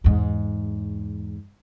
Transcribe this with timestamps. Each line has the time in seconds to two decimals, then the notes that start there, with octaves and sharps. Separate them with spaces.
0.04 E2 G#2